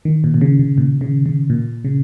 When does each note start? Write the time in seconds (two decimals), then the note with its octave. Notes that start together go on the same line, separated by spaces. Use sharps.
0.05 D#3
0.24 A#2
0.34 A#2
0.41 C#3
0.59 C#3
0.78 A#2
1.01 C#3
1.26 C#3
1.50 A#2
1.84 C#3